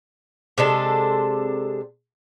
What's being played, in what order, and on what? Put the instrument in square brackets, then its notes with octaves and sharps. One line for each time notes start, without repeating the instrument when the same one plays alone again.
[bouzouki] C3 G#3 D4 A4